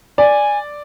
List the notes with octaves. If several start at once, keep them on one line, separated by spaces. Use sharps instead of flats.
D5 G#5